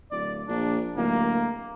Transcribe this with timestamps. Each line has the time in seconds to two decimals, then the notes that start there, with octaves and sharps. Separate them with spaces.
0.11 D1 D5
0.48 A#1 D4
0.97 D1 A#3